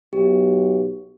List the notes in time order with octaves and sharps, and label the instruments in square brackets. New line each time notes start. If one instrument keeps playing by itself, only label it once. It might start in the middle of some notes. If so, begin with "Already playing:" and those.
[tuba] B1 [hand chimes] G4